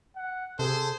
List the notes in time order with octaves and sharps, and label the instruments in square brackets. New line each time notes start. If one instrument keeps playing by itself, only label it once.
[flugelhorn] F#5
[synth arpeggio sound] C3 [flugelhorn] G#4 [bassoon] A4 [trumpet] C5